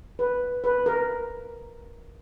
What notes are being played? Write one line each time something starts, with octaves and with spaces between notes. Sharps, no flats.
B4
B4
A#4